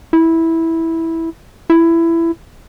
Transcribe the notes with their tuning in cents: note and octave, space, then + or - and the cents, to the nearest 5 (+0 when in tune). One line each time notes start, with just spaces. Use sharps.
E4 -10
E4 +15